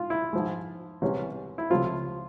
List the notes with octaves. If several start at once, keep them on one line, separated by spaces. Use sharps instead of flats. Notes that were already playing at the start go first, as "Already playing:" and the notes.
Already playing: G#2 F4
E4
G#2 F3 G#3
C2 C3 E3 G#3 C#4
E4
C#2 C3 F3 A3 C4 F4